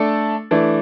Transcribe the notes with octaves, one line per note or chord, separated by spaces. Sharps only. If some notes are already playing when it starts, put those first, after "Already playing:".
Already playing: A3 D4 A4
E3 A3 D4